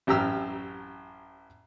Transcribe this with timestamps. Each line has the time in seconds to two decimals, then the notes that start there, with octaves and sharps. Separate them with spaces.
0.07 A1 F#2 G4 A#5 E6 F6